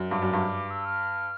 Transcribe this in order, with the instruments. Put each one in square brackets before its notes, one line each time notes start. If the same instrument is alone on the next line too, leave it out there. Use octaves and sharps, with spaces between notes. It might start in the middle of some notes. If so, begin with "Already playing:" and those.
Already playing: [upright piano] F#2
[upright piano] G2 [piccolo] D6
[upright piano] F#2
G2
[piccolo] E6
F6